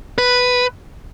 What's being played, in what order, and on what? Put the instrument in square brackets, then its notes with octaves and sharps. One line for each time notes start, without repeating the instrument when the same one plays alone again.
[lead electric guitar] B4